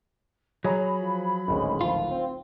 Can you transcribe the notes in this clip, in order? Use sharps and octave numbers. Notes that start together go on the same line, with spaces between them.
F#3 G#4 C#5 A#5 B5
F3
D1 G#1 G#3 C#4
F3 F4
C4